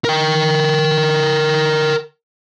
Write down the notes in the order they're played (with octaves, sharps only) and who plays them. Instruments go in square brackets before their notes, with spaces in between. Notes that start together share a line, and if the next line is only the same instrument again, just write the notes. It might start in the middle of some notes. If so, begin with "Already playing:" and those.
[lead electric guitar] A#4 G5